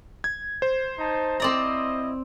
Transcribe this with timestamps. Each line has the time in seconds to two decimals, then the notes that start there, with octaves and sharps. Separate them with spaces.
0.24 G#6
0.62 C5
0.98 D#4 A5
1.40 C4 E4 D5 D#5 A#5